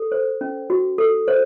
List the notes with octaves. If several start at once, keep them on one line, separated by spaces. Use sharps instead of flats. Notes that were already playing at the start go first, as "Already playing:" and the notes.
Already playing: A4
C5
C#4
F#4
A4
C5